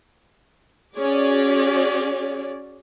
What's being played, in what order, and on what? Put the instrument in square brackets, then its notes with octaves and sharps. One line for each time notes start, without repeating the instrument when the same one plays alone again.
[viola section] C#4 F#4 G#4 C#5 D5